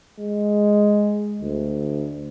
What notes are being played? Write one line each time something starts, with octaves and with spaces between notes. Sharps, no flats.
G#3
D2